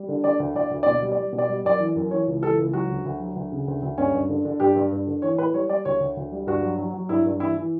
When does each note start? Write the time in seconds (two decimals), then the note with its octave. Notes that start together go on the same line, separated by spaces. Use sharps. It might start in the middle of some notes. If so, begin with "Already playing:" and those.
Already playing: G3
0.08 D3
0.24 D3 D5
0.39 D2
0.55 D2 D5
0.71 D2
0.83 B2 D5
1.02 G3
1.12 D5
1.18 G3
1.33 B2
1.38 D5
1.49 G3
1.65 F#2 D5
1.80 E3
1.96 F#2
2.11 E3 C#5
2.27 C#2
2.43 E3 A4
2.58 C#2
2.73 F#3 F#4
2.89 D2
3.05 D2
3.20 F#3
3.36 D2
3.52 C#3
3.67 D2
3.82 D2
3.98 G2 C#4
4.14 G2
4.29 D3
4.45 D3
4.60 G2 G4
4.76 G2
4.92 G2
5.07 D3
5.22 E3 C#5
5.38 A2 B4
5.53 G3 C#5
5.69 G3 D5
5.85 D2 C#5
6.00 D2
6.17 D2
6.32 G3
6.47 G2 F#4
6.63 F#3
6.79 F#3
6.94 F#3
7.09 G2 E4
7.26 G2
7.40 E3 E4
7.57 E3